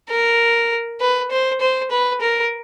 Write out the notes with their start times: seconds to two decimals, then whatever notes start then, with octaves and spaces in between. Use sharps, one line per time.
0.10 A#4
1.00 B4
1.31 C5
1.61 C5
1.91 B4
2.21 A#4